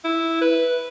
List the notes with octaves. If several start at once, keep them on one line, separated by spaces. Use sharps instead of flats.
E4
B4